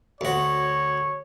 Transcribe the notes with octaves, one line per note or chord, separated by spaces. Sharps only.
D2 F#4 C#5